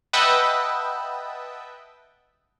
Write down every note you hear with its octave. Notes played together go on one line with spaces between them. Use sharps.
B4 D#5 E5 F#5 G5 A5